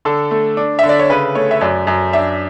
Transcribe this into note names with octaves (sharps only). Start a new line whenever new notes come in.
D3 A4
A3
D4
D3 E5
D5
C#5
C#3 B4
A3 C#5
E5
F#2 D5
F#2
D4 E5